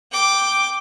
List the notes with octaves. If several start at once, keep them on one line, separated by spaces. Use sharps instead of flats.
G5 D6